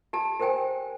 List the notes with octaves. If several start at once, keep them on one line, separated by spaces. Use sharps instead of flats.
G4 A5
G4 A#4 C5 G5 G#5